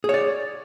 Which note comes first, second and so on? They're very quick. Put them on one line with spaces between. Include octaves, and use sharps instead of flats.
G#4 C#5 D5